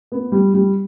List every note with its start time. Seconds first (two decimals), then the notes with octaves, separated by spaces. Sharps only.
0.12 B3
0.32 G3
0.54 G3